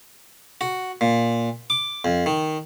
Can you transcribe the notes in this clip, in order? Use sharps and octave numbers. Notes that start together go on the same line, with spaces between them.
F#4
A#2
D6
F2
D#3